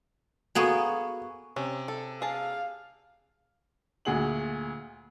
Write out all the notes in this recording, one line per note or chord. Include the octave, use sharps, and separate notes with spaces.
A#3 B3 F#4 G#4 A4 C#6
C3 C#4
A4
G#4 F5 A5
D2 A#2 G#4 F#5 F#7